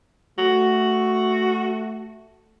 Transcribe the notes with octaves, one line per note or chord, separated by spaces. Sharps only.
A3 F#4